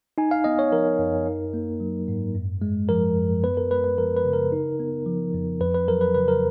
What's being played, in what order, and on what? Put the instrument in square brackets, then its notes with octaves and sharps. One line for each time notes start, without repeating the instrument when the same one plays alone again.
[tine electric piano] D#4 G#5
F5
B3 D#5
C#5
F3 A#4
F#2
D#4
A#3
F#3
G#2
F#2
G#3
F3 A#4
F#2
B3 B4
A#4
G#3 B4
B4
F3 A#4
B4
C#3
A#4
D#4
B3
F3
F2
F2 B4
B4
F#3 A#4
B4
C#3 B4
A#4